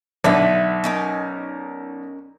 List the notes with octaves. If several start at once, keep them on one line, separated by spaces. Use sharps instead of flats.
B1 D3 B4 E5 F#5
C#4 D#4 A#4